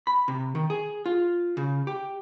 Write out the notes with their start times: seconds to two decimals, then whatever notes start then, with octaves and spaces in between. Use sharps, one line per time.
0.07 B5
0.28 C3
0.55 D#3
0.70 G#4
1.06 F4
1.57 C#3
1.87 G4